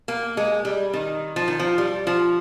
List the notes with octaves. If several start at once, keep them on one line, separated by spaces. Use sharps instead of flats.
A#3
G#3
G3
D#3
F3
D#3
F3
G3
F3